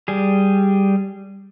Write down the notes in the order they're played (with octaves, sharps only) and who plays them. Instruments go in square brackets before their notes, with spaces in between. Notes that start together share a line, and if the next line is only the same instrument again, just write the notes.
[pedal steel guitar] G3 G#4